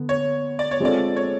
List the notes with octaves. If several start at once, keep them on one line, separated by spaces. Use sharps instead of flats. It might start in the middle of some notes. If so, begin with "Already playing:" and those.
Already playing: D3 B3
C#5
D5
C#5
G#3 C4 F4 A4 D5
C#5